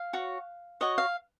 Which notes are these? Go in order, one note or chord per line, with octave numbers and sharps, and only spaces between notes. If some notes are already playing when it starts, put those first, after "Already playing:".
Already playing: F5
F#4 C#5
F#4 C#5 D#5
F5